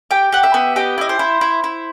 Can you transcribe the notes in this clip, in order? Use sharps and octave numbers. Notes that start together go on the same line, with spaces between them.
G4 G5
G4 F#5
E5
B3
G4 D#5
E4 D#5
C5
E4
E4
E4